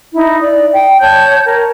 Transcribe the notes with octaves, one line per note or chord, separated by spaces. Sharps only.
D#4 E4
D5
G5
C#5 A5 G6
A#4